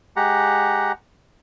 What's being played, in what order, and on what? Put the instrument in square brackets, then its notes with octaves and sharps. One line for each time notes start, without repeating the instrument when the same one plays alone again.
[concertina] G#3 G4 F#5 A#5